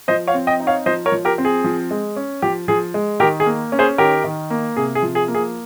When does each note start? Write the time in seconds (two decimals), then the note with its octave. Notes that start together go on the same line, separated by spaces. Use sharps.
0.08 F3 C5 D#5
0.27 C#5 F5
0.34 C4
0.47 D#5 G5
0.60 D#4
0.67 C#5 F5
0.86 F3 C5 D#5
1.06 A#4 C#5
1.12 F3
1.25 G4 A#4
1.38 C4
1.45 G#4
1.64 F3
1.91 G#3
2.16 C#4
2.42 F3 G4
2.68 F3 G#4
2.94 G#3
3.20 D#3 G4 A#4
3.40 G#4
3.46 A#3
3.72 C#4
3.79 G#4 C5
3.98 D#3 G4 A#4
4.24 D#3
4.50 A#3
4.77 C3 G#4
4.95 G#4
5.02 F3
5.15 G#4
5.28 A#3
5.35 G#4